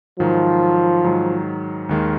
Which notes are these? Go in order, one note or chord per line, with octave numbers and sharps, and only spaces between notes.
G#2 D#3 F3 F#3
G#2 D#3 F#3
D#2 D#3 G#3